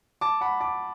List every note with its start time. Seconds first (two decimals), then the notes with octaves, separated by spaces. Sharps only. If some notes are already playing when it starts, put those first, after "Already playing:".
0.21 A5 D6
0.41 F#5 B5
0.61 A5 D6